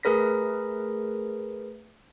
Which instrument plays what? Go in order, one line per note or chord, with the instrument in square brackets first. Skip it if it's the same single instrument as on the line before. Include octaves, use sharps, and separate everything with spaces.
[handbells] A3 G#4 A#4 B4 A#6 B6